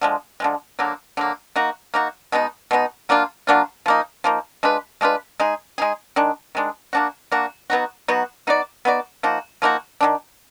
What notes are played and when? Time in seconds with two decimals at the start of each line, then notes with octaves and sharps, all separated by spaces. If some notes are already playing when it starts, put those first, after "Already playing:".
0.01 D3 F3 G#3
0.40 D3 F3 G#3
0.79 D3 F#3 A#3
1.17 D3 F#3 A#3
1.56 A#3 D#4 F#4
1.94 A#3 D#4 F#4
2.32 B2 G#3 B3 D#4
2.71 B2 G#3 B3 D#4
3.09 F#3 A#3 D4 F4
3.47 F#3 A#3 D4 F4
3.86 F3 A#3 D#4
4.24 F3 A#3 D#4
4.63 G#3 D4 F4 B4
5.01 G#3 D4 F4 B4
5.40 G#3 D#4 G#4
5.78 G#3 D#4 G#4
6.16 D#3 G#3 D4
6.55 D#3 G#3 D4
6.93 A#3 D4 F#4
7.32 A#3 D4 F#4
7.70 F#3 B3 D#4 F#4
8.08 F#3 B3 D#4 F#4
8.47 B3 D#4 F#4 D5
8.85 B3 D#4 F#4 D5
9.23 F3 A#3 D#4 F#4
9.62 F3 A#3 D#4 F#4
10.01 D#3 F#3 D4